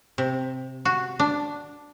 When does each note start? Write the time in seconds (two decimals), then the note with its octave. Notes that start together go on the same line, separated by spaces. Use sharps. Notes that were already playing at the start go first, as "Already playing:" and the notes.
0.18 C3
0.85 F#4
1.19 D4